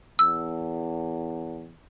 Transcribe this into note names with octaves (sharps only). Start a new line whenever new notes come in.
E2 E6